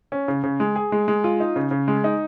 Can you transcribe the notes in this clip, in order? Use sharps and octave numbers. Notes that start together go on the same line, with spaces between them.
C#4
C#3
C#3
G#3
G#4
G#3
G#3
F4
D#4
C#3
C#3
G#3
D#4